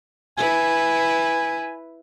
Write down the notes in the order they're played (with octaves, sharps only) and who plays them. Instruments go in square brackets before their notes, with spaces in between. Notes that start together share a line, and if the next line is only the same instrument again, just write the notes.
[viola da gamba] E4 B4 [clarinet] G#5